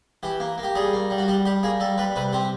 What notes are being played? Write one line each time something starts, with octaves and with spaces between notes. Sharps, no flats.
E3 G4
A#3
A#3
G4
G3 G#4
A#3
G3
F#4
G3 G4
G3 G4
A#3 G#4
G3 A4
G3 B4
C3 B4
C4 G4